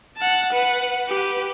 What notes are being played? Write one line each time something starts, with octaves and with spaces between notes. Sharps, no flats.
F#5 A5
B4 F#5
G4 B4